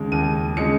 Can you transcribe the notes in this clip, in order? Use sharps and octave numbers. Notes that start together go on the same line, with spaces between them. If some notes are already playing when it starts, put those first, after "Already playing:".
Already playing: D#2 C#3 G#3
D#2 D#7
C#3 G#3 C#7